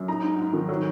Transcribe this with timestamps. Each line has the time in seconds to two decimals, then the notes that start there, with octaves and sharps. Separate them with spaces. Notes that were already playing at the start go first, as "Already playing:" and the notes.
Already playing: F#2
0.08 D#4 A#5
0.23 G#2
0.39 G#2
0.53 D#3
0.69 F#3